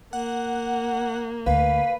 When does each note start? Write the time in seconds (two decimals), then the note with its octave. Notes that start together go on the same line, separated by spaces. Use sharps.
0.13 A#3 F#5
1.46 D2 B4 F5